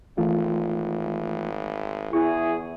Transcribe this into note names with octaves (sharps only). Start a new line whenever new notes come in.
G#1 E3 A3 F4
E2 E4 G#4 C#6